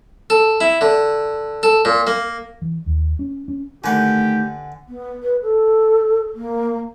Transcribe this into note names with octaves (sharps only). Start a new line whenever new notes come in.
A4
E4
D3
A4
A#2
A#3
E3
D#2
C#4
C#4
D3 D#3 A3 G4 B4 F#5 G#5
B3
B4
A4
A#3